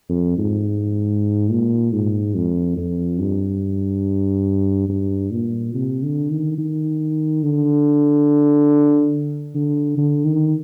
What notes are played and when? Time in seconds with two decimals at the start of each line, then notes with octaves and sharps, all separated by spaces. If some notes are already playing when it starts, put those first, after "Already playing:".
0.09 F2
0.38 G#2
1.51 A#2
1.92 G#2
2.35 F2
2.77 F2
3.19 G2
4.89 G2
5.31 A#2
5.74 C3
6.02 D3
6.30 D#3
6.58 D#3
7.43 D3
9.55 D3
9.97 D3
10.25 D#3